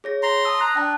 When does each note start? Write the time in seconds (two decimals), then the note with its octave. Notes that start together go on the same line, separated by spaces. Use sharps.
0.04 G#4 C#5 A#6
0.23 A#5 C6
0.45 A5 D#6 E6
0.61 A#5 F#6
0.76 D4 G5 A5